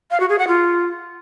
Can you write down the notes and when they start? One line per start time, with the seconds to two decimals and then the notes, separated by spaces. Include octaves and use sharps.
0.11 F5
0.20 F#4
0.29 G#4
0.39 F#5
0.48 F4